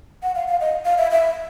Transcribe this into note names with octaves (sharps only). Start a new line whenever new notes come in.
F#5
F5
F5
D#5
F5
E5
E5